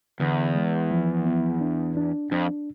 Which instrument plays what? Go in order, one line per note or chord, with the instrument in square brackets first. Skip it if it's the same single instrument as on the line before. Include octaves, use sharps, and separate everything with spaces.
[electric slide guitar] E2 [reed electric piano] D3
[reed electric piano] G#3
F3
B3
D4
D4
[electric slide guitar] F2 [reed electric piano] D4